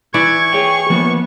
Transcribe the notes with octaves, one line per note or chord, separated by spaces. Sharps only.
E3 D5 E5 C#6 G#6
G#4 C#5 G5
F3 A#3 B3